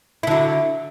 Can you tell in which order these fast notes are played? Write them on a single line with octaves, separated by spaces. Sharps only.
E4 D3 F#3